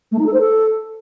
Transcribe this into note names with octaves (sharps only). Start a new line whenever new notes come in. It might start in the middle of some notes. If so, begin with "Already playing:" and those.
A3
D#4
A4
C5
A4